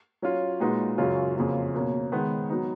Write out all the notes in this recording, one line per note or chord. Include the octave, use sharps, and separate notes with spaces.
F#3 C#4 F4
A#2 G#3 D#4 F#4 B4
F#2 C#3 F#3 C#4 F4
F2 C#3 F#3 A#3 F4
B2 A#3 C#4
D#3 G#3 B3
F#3 B3 D#4